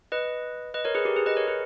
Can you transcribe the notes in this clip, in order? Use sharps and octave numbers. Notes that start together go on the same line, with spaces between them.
B4 D#5
B4 D#5
A#4 C#5
G#4 B4
G4 A#4
G#4 B4
B4 D#5
A#4 C#5
G#4 B4